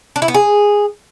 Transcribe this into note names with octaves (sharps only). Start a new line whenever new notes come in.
D4
E4
B3
G#4